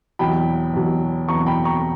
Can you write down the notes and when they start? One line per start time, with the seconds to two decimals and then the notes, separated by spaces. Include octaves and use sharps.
0.19 E2 B2 F#3 G5 B5
0.74 E2 B2 F#3
1.29 E2 B2 F#3 A#5 C#6
1.46 G5 B5
1.64 A#5 C#6